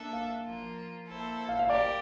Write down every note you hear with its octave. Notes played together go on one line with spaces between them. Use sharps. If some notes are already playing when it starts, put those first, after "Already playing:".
Already playing: A#3 D4 A4 E5
F5
F3 A#3 F4
A#3 E4 A4 C5
F5
F5
G4 A#4 D5